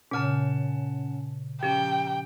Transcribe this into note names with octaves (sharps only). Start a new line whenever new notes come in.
A#2 C#3 C#4 F#5 A5
F3 C#4 G4 G5